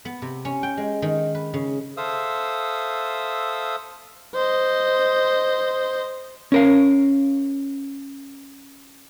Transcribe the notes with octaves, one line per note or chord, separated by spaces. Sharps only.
B3
C3
C#4
G5
G#3
D#3
B4
C#3
A4 C5 E5 F5 D#6 E6
C5 D#5
C#4 A#4 F5